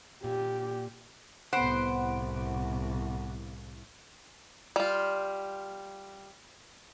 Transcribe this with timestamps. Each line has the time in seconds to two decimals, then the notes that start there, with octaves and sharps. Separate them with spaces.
0.24 A#2 G4
1.53 C2 A2 B3 C5 F#5 B5 D7
4.76 G3 F4